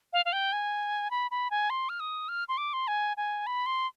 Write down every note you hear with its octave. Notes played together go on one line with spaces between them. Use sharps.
F5
F5
G5
G#5
B5
B5
G#5
C6
F6
D#6
F6
C6
D6
C6
G#5
G#5
B5
C6